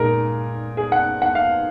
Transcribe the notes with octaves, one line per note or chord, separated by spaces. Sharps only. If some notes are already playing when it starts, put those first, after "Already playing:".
Already playing: A#2 G#3 D#4 G#4 A#4
G#4
F#5
F#5
F5